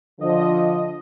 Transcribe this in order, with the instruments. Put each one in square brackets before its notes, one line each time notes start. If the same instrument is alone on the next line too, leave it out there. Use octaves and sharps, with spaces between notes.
[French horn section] D3 F3 [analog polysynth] D#5